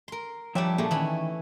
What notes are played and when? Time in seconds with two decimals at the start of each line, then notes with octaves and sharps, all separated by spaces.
0.08 A#4 C6
0.55 F3 G3 D4 C#5 E5 G5
0.78 A#2 A3 A#3 G4 G#4
0.91 D#3 E3 C#4 B5